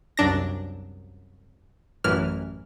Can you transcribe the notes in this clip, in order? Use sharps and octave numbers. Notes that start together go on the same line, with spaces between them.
C2 F#2 D4 A#6
A1 F#2 E3 F6